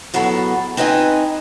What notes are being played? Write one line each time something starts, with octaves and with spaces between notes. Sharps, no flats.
A2 F#3 B3 G#4 A4
C4 D#4 B4 D#5 E5 G#5